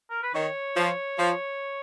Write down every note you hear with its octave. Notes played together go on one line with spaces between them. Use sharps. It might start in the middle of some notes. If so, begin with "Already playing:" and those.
A#4
B4
D#3 C#5
F3
F3